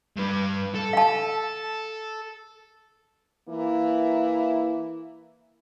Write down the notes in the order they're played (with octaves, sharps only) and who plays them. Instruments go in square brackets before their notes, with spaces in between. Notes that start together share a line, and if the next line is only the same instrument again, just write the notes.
[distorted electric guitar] G2 B4
A4
[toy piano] F5 A5
[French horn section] E3 A#3 E4